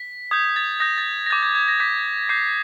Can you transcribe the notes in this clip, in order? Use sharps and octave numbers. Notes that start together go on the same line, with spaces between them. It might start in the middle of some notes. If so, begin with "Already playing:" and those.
Already playing: B6
D#6 G6 G#6
A6
D#6 G6 A#6
A6
A#6
D6 G6 A6
G#6
G#6
A#6
D6 G6 B6
D6 G6 C7